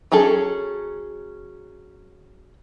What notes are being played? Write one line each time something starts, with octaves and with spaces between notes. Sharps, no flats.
F#3 C#4 G#4 A4